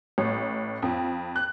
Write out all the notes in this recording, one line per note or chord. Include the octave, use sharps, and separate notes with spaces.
A1
F2
F#6